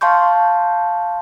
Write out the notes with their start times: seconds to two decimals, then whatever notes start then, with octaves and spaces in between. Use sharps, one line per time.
0.01 F5 A5 C6 C#6 G6